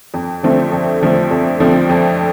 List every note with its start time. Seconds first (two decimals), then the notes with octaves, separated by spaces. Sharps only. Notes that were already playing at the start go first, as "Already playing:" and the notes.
0.14 F2
0.43 D3 F3 A3 C4
0.72 F2
1.02 D3 F3 A3 C4
1.31 F2
1.60 D3 F3 A3 C4
1.89 F2